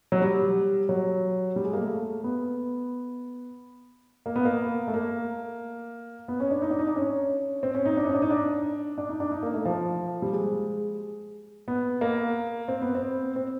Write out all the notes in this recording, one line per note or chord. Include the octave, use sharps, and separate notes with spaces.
F#3
G3
F#3
G3
G#3
A#3
A3
B3
A#3
B3
A#3
A3
A#3
B3
C#4
D4
D#4
D4
D#4
D4
C#4
C4
C#4
D#4
D4
D#4
C#4
D4
D#4
D4
D4
D#4
D4
D#4
A#3
A3
F3
G3
G#3
B3
A#3
C4
B3
C4
C4